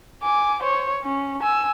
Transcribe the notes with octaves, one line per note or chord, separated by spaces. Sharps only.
G#5 D6
C5 C#5
C#4
G#5 E6